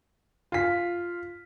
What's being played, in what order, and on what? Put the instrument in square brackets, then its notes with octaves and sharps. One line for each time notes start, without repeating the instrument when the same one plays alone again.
[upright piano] F4 B6